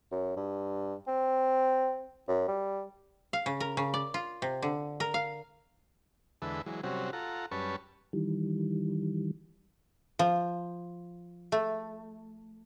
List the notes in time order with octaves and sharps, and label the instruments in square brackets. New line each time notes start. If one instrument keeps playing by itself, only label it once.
[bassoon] F#2
G2
C4
F#2
G3
[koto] F5
C#3
A#4
C#3
D5
F4
C3
D3
A#4
F5
[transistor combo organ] E2 D3 G#3 A4 B4 E5
E3 F#3 G#3
C3 F#3 G3 C4 C#4 F#4
F4 A4 F#5 A#5
F#2 G3 C#4 B4 A5 C#6
[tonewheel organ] D#3 E3 G3
[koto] F3
A3